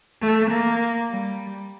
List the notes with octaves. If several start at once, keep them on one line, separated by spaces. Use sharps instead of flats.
A3
A#3
G3